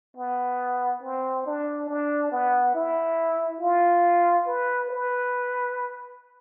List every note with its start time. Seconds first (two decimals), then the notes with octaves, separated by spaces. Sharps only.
0.17 B3
1.03 C4
1.46 D4
1.89 D4
2.32 B3
2.75 E4
3.61 F4
4.47 B4
4.91 B4